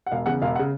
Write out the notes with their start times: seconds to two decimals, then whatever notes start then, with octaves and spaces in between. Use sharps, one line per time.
0.06 F#5
0.11 E1 F5
0.26 E2 C#3 F#5
0.42 E1 F5
0.56 F#5
0.59 C#3